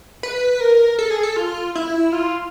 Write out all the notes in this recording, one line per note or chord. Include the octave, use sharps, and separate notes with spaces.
B4
A#4
A4
G#4
A4
F4
E4
F4